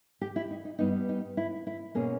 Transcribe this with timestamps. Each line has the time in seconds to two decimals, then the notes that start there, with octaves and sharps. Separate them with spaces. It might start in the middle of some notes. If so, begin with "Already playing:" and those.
0.21 G4
0.36 E4
0.51 D#4
0.65 D#4
0.79 G2 G3 B3 D#4
1.09 D#4
1.37 E4
1.67 E4
1.95 B2 A#3 C#4 G#4